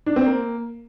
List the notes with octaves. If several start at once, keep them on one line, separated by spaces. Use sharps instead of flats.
D4
C4
A#3